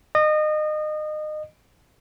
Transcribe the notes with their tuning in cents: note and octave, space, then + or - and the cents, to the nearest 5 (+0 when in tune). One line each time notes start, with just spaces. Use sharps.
D#5 -30